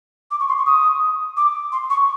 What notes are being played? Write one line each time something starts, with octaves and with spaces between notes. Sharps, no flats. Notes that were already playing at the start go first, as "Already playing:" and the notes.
D6
C#6
C6
C#6
D#6
D6
C6
C#6